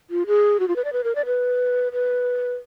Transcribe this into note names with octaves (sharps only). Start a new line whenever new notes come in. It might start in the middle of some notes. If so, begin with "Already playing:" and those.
F4
G#4
F#4
F4
B4
D5
B4
A#4
D5
B4
B4